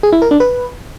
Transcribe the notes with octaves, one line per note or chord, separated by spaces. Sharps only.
G#4
E4
A#4
D4
B4